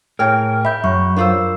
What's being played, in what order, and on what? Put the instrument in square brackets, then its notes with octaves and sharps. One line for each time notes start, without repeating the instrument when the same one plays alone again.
[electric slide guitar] A2 A#4 [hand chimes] G#4 [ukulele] C#5 G5
[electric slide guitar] E5 [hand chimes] B5 G6
[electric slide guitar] F#2 [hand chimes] C#6
[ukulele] D4 F4 C5 [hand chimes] A#4 E6